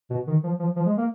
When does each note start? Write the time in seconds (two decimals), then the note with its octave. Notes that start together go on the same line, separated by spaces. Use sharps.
0.10 B2
0.27 D#3
0.44 F3
0.60 F3
0.76 F3
0.86 G#3
0.98 A#3